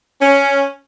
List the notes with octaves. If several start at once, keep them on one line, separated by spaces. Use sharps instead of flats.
C#4